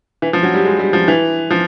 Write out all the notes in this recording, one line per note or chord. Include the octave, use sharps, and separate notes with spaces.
E3
F3
F#3
G3
G#3
G3
F3
E3
F3